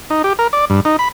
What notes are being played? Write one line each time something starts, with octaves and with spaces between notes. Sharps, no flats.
D#4
G4
A#4
D5
G2
D#4
B5